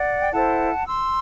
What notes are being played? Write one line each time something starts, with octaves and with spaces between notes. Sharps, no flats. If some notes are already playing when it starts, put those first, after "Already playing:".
Already playing: D5 F#5
G5
E4 A4 C5 F#5 A5
C6 E6